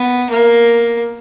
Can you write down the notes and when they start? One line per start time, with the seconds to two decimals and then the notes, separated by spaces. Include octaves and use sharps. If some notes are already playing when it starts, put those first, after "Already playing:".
Already playing: B3
0.30 A#3